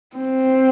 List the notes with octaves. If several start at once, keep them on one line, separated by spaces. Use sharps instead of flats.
C4